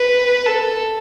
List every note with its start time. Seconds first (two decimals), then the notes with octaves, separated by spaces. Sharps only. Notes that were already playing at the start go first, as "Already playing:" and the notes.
Already playing: B4
0.46 A4